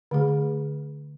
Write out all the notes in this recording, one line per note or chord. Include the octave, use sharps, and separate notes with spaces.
D3 A3 G#4